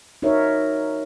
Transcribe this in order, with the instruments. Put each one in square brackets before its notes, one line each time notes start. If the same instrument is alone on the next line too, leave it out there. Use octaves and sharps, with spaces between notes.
[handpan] D#4 F#4 A#4 C#5 E5